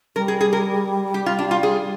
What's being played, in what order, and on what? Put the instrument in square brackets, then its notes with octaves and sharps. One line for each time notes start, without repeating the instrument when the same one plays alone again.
[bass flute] G3 [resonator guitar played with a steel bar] A#4
[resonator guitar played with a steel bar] G#4
G#4
A#4
G4
F4
D4
F4
G#4